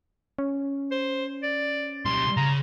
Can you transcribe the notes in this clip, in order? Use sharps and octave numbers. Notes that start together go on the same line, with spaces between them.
C#4
C5
D5
B1 G3 C6
C#3 A#5